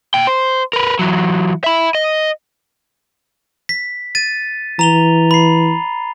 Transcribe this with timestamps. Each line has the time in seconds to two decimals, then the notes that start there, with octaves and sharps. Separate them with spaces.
0.14 A#2 G5
0.27 C5
0.73 A#4 B4
0.99 E3 F#3
1.64 E5 B5
1.95 D#5
3.69 B6
4.15 A6 D#7
4.79 E3 A#5 F7 G7
5.31 B5 C7